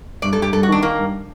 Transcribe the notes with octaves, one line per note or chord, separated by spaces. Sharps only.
G2 D5
A4
G2 G4
G2 A4
F#4
D#3 D4
D#3 A#3
G2